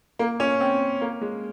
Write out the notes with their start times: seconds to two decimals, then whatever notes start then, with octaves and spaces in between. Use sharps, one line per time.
0.19 A#3
0.40 C#4
0.61 C4
1.01 A#3
1.21 G#3